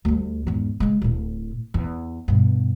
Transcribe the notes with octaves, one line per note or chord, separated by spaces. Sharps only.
D2 G3
E2 G#2
C#3 G#3
D1 A2
E2
G2 B2